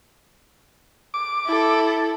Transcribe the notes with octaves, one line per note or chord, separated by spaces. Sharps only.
D6
E4 A4